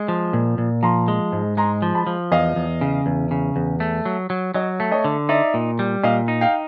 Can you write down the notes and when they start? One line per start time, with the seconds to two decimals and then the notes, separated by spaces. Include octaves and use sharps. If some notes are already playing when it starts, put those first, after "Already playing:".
Already playing: G#3
0.08 F3
0.33 A#2
0.58 A#2
0.83 F3 A#5 C6
1.08 G#3
1.32 G#2
1.57 G#3 A#5 C6
1.82 F3
1.94 A5 B5
2.07 F3
2.32 E2 D#5 F5
2.56 E2
2.81 C#3
3.06 E2
3.31 C#3
3.56 E2
3.80 A3
4.06 F#3
4.30 F#3
4.54 F#3 C#5 D#5
4.80 A3
4.91 C#5 D#5
5.04 D3
5.29 D#4 D5 E5
5.54 A#2
5.79 G3
6.03 A#2 D#5 F5
6.28 D#4
6.41 F5 G5